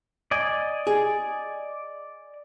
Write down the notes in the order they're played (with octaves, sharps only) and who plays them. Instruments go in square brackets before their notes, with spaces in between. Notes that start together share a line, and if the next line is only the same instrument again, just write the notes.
[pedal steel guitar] D5 D#5 G#5
[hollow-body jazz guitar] G#4